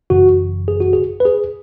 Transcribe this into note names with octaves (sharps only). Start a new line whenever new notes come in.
G#1 F#2 C#3 E3 F#4
G#4
F#4
G#4
B4
G#4